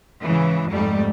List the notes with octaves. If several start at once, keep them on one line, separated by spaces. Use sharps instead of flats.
G#2 C#3 E3
F2 G#2 G3 A3